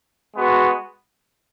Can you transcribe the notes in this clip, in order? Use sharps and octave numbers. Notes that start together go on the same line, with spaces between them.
G#3 B3 F#4